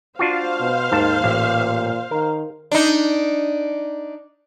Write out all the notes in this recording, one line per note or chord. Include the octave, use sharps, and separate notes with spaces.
D4 F4 F#4 C5 F5
B2
D#2 G#2 D#3 A5
A1 A#2
D#3 A#4
D4 D#4